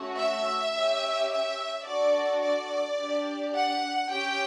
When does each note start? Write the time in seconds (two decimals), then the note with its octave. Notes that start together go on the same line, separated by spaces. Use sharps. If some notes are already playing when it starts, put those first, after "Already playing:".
Already playing: A3 C#4 F#4
0.19 E5
0.74 C#4 G4
1.31 E5
1.86 D4 F#4 A4 D5
2.42 D5
2.98 D4 G4
3.54 F#5
4.10 C#4 G4 G5